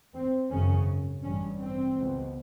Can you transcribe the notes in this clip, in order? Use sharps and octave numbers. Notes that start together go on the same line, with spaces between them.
C4
G#1 F#2 C#3 C#4
A1 G2 C#4
C4
C#2 B2